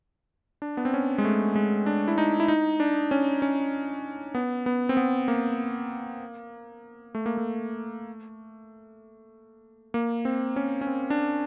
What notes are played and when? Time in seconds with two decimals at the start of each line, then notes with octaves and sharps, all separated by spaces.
0.62 D4
0.77 B3
0.85 C4
0.94 C#4
1.18 G#3
1.25 A3
1.56 G#3
1.86 D4
2.08 E4
2.18 D#4
2.40 E4
2.48 D#4
2.80 D4
3.11 C#4
3.42 C#4
4.35 B3
4.66 B3
4.89 C4
4.97 B3
5.28 A#3
7.15 A3
7.26 A#3
7.37 A3
9.94 A#3
10.25 C4
10.56 C#4
10.81 C#4
10.87 C4
11.10 D4